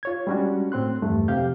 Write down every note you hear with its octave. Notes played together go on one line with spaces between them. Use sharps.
F4 C#5 G#6
G3 G#3 C#4 D4 F#4
A2 C4 C6 F#6
E2 G2 A3
F2 C3 G4 F5 G6